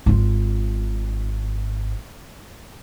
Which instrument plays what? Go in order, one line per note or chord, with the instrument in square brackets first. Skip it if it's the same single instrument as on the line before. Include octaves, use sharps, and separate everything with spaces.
[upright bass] G#1 F4